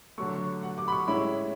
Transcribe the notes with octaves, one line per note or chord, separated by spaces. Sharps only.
D3 F#3 A3 C#6
F#5
D6
B5
C#6
A2 G#3 C#4 E4 B5